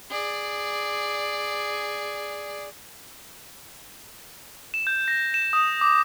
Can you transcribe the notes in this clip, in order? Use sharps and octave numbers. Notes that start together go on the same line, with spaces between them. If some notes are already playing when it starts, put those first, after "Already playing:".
G#4 D5
E7
G6
A#6
E7
D#6
D6